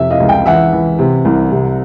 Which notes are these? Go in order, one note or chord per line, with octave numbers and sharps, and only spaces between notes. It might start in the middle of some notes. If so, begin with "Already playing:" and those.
Already playing: F2 C3 E5
D#5 F5
C#2
F5 G5
E3 E5 F#5
E3
C3
C2
C3